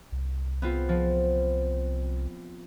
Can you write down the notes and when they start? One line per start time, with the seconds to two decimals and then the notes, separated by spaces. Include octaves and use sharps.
0.12 C2
0.62 B3 C4 F4
0.89 F3